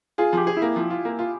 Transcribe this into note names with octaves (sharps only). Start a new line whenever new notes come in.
F4 G#4
F3 G4
G#4
E4
A#3
F3
F4
A#3
F4